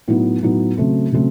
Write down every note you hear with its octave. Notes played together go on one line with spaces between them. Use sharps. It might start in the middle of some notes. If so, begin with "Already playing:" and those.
A2 F#3 B3 D#4
A2 F#3 B3 D#4
C#3 F#3 A3 C4
C#3 F#3 A3 C4